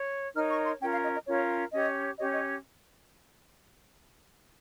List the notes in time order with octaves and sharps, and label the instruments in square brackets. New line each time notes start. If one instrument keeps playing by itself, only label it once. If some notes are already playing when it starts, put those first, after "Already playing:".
Already playing: [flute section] C#5
D#4 A#4 C#5 F6
C#6
C6
C#4 F4 A#4 G5
F5
D#5
D#5
C#4 F4 A#4 C#5
C#4 G4 C#5 D#5
C#4 G4 C#5 D#5
D#5